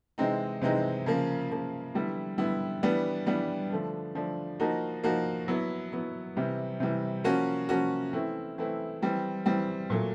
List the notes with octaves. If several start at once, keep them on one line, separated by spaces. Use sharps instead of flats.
C3 E3 G#3 C4 D#4
C3 E3 G#3 C4 D#4
C#3 F3 A#3
C#3 F3 A#3
D3 G3 B3 E4
D3 G3 B3 E4
E3 G3 B3 D4
E3 G3 B3 D4
D3 F3 A3 D4
D3 F3 A3 D4
F3 A#3 D#4 F#4
F3 A#3 D#4 F#4
F#3 B3 E4
F#3 B3 E4
C3 E3 G3
C3 E3 G3
F3 A#3 C#4 F#4
F3 A#3 C#4 F#4
E3 A3 C4 E4
E3 A3 C4 E4
E3 G3 C4
E3 G3 C4
A#2 F#3 A3